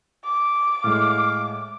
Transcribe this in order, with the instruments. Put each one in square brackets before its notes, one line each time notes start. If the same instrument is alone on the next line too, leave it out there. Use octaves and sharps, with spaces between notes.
[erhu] D6
[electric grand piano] A2 G#3 [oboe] F5